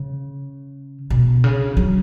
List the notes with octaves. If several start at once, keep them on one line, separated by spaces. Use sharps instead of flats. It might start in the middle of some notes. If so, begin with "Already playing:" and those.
Already playing: C#3
B2
C#3
F#3